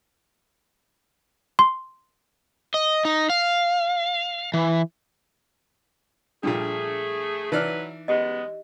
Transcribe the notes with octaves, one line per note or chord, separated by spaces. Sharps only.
C6
D#5
D#4
F5
E3
A#2 F3 G3 A3 D4 G#4
E3 F#3 D#4 B4 D5 F6
F#2 G#3 B3 G4 D#5